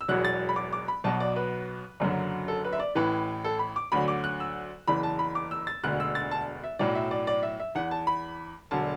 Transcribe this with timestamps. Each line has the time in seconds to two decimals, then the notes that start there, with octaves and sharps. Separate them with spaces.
0.01 E6
0.08 E1 E2 B2 F#3 F#6
0.25 A6
0.49 B5
0.56 D6
0.73 D6
0.88 B5
1.04 B1 B2 F#3 A5
1.20 D5
1.36 B4
2.00 F#1 F#2 D3 F#3
2.48 A4
2.65 B4
2.73 E5
2.80 D5
2.95 A1 A2 E3 B4
3.44 A4
3.59 B5
3.76 D6
3.92 D2 D3 F#3 B5
4.08 D6
4.24 F#6
4.40 E6
4.88 F#1 E2 E3 B5
5.03 A5
5.19 B5
5.35 D6
5.51 E6
5.67 A6
5.84 E1 D2 D3 F#6
6.00 E6
6.15 A6
6.31 A5
6.64 E5
6.79 B1 A2 F#3 D5
6.95 E5
7.11 D5
7.27 D5
7.43 E5
7.60 E5
7.75 E2 E3 F#5
7.91 A5
8.07 B5
8.71 E1 D3 F#3 A5